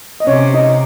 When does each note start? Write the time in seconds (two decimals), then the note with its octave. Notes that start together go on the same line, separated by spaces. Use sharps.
0.20 D#5
0.27 C3 C#4 C#5
0.54 D#4 D#5